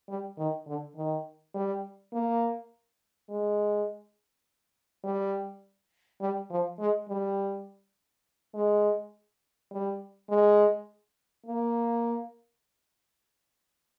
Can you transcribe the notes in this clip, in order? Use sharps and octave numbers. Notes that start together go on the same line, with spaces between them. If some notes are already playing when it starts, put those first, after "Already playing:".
G3
D#3
D3
D#3
G3
A#3
G#3
G3
G3
F3
G#3
G3
G#3
G3
G#3
A#3